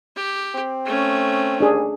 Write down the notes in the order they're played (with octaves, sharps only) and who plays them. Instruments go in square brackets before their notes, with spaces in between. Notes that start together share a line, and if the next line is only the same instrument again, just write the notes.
[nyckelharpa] G4
[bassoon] C4
[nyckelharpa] A3 C#4
[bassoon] D#2 [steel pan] D4 G#4